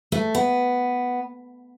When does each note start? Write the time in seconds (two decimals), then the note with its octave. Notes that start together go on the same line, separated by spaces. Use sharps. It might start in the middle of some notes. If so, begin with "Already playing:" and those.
0.12 A3
0.35 B3